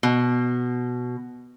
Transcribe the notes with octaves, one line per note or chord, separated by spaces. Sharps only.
B2